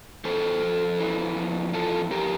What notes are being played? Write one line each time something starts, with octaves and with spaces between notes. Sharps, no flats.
E3 A4 C5
F2
E3
F2
E3 F4 A4
F2 G4 A#4